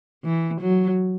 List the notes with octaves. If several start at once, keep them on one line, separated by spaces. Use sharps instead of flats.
E3
F#3